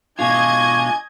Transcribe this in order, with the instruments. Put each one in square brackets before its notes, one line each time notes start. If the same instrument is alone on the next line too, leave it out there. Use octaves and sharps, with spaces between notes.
[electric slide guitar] B2 G#3 F4 [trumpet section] D4 G#5 [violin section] D#5 G#6 [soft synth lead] C#6